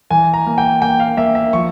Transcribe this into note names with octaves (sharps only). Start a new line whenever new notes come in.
E3 G#5
A#5
A#3
G5
A#3 G5
F5
A#3 E5
E5
F3 C#6